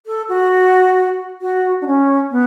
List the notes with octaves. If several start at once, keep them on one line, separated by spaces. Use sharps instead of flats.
A4
F#4
F#4
D4
C#4
B3